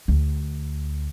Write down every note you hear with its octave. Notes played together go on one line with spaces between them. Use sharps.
D2